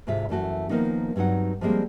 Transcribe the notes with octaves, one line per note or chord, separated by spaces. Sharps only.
D2 G#2 C3 F4 E5
F#2 E3 A3 F#4
D#3 F3 A#3 B3 D#4
G2 F#3 C4 D#4 F#5
F3 G3 G#3 A#3 C4